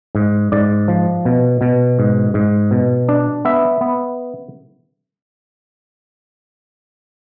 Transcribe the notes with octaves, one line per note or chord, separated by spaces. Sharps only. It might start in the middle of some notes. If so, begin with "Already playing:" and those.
G#2
G#2 D5
F3
B2
B2
G#2
G#2
B2
D4
B3 E5
B3